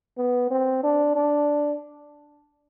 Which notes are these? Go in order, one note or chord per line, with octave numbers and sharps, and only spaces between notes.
B3
C4
D4
D4